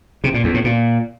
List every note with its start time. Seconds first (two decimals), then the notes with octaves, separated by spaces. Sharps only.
0.24 C3
0.34 A#2
0.44 E2
0.54 A2
0.64 A#2